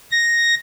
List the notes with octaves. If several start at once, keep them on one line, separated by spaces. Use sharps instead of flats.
A#6